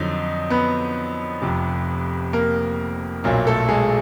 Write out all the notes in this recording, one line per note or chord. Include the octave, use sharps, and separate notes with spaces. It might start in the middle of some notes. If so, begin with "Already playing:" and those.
Already playing: F2 D3 F#3 D#4
B3 B4
F1 F2 C3
A#3 A#4
B1 A#2 F#3 A#3
A3 A4
G#3 G#4